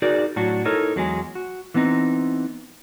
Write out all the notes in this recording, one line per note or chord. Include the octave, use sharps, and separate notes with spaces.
D#4 F#4 G#4 A#4 D5
A2 F#3 D4 F#4
D#4 E4 A4 A#4 C#5
E2 F#3 G#3 G#4
F#4
E3 B3 C4 D#4